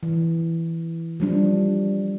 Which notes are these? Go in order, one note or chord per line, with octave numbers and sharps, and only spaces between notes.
E3
F3 G3 D4